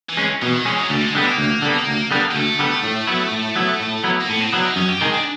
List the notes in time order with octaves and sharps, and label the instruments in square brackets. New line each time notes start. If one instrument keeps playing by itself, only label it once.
[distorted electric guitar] E3
[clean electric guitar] G#3 C#4
[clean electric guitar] B2 [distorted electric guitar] E3
[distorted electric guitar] D#3
[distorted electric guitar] E3 [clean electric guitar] G#3 C#4
[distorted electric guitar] F#3
[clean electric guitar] D2 [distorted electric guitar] G3
[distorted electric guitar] G#3
[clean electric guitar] D3 G3 B3 [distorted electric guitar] G#3
[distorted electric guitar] A#3
[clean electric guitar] D2
D3 G3 B3
D2
D3 G3 B3
[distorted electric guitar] G#3
[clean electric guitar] D2 [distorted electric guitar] A3
[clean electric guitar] D3 G3 B3
A2
F#3 B3 E4
A2
F#3 B3 E4
A2
F#3 B3 E4
[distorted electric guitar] A#3
[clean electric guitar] A2 [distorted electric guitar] B3
[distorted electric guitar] C4
[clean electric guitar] F#3 B3 E4 [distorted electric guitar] D4
[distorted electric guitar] D#4
[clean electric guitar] F#2 [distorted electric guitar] C#4
[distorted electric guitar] G4
[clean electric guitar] D#3 G#3 [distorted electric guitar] G#4
[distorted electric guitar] D4